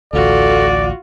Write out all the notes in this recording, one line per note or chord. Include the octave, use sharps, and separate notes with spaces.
A1 D2 F4 F#4 A4 D5